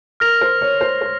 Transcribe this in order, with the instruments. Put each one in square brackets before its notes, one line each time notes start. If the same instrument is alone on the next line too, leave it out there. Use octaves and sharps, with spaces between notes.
[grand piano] A#4 [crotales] F6 A#6 F7
[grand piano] C5
C#5
C5
C5